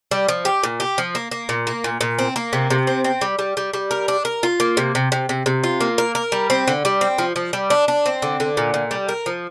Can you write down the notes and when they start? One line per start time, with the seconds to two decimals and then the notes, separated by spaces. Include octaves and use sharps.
0.11 G3
0.28 F3
0.45 G4
0.63 A#2
0.80 G4
0.98 F3
1.15 A#3
1.31 A#3
1.49 A#2
1.67 A#3
1.84 A#2
2.01 A#2
2.19 C4
2.36 A#3
2.53 C3
2.70 C3
2.87 C4
3.04 C4
3.21 G3
3.39 G3
3.57 G3
3.73 G3
3.91 A#4
4.08 D4
4.25 A#4
4.43 F4
4.60 A#3
4.77 C3
4.95 C3
5.12 C3
5.29 C3
5.46 C3
5.64 F4
5.80 A#3
5.98 A#4
6.15 A#4
6.32 G3
6.50 C4
6.68 D3
6.85 G3
7.01 C4
7.18 F3
7.36 F3
7.53 G3
7.70 D4
7.88 D4
8.06 C4
8.22 D3
8.40 D3
8.57 A#2
8.74 A#2
8.91 G3
9.09 A#4
9.26 F3